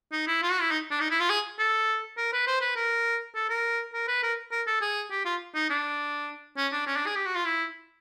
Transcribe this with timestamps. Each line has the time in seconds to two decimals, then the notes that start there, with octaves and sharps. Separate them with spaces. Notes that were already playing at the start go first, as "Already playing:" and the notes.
0.12 D#4
0.27 E4
0.42 F4
0.51 F#4
0.61 E4
0.71 D#4
0.90 D4
1.00 D#4
1.11 E4
1.20 F4
1.29 G#4
1.59 A4
2.18 A#4
2.33 B4
2.47 C5
2.61 B4
2.76 A#4
3.35 A4
3.50 A#4
3.94 A#4
4.08 B4
4.23 A#4
4.52 A#4
4.67 A4
4.81 G#4
5.11 G4
5.25 F4
5.55 D#4
5.70 D4
6.57 C#4
6.72 D4
6.87 C#4
6.96 D4
7.06 G#4
7.16 G4
7.26 F#4
7.35 F4
7.45 E4